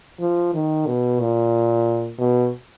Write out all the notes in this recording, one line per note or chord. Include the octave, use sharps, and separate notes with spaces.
F3
D#3
B2
A#2
B2